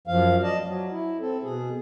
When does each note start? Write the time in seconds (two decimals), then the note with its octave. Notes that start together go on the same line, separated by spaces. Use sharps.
0.07 F#2 F3 F5
0.43 D5 D#5 A5
0.66 F#3
0.92 E4
1.20 C4 A4
1.43 B2 G#4